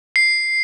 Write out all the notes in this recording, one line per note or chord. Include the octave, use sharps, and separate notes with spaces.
C7